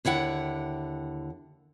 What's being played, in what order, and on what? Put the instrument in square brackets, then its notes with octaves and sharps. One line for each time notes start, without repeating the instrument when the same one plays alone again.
[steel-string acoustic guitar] D#2 D3 E4 F#5 G5